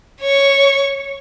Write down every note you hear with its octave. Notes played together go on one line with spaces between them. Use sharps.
C#5 C#6